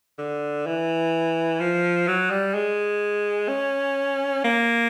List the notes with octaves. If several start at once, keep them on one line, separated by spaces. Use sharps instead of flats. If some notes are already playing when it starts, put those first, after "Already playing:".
D3
E3
F3
F#3
G3
G#3
C#4
A#3